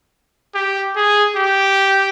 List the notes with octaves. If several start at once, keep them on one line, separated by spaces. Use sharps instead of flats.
G4
G#4
G4